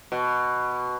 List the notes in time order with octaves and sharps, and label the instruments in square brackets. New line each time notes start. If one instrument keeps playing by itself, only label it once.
[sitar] B2